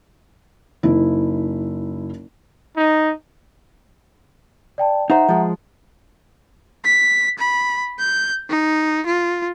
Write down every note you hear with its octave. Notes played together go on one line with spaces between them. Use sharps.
F#1 D#4 E4
D#4
D5 G5 A5
D#4 C5 E5 F#5 A#5
F3 G#3
B6
B5
G6
D#4
F4